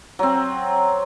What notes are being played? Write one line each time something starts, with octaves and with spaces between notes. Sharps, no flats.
F#3 C4